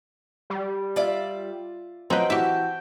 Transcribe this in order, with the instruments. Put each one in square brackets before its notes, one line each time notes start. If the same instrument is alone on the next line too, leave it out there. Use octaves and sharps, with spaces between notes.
[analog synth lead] G3
[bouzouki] F4 D5 E5
[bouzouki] F3 [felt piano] F#3 D#5 [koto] C4 B4 [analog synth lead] G5
[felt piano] E3 F#4 [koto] G4 E5 [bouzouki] A5